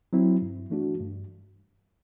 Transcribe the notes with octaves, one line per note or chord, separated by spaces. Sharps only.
F#3 C4 E4
G2
E3 A3 D4 F#4
G2